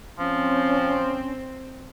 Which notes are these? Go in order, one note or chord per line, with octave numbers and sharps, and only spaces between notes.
F3 C4 C#4